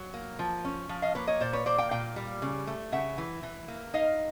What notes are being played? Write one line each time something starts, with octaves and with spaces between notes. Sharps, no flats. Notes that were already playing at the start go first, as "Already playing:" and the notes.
Already playing: F#3
A#3
F3
C#4
F3
D#5 F5
A#3 B4 C#5
C#5 D#5
A#2 C5 D5
B4 C#5
A#3 C5 D5
F5 G5
A#2 F5 G5
G3
C#3
A3
C#3 E5 F#5
E3
E3
A#3
D#4 D#5 F5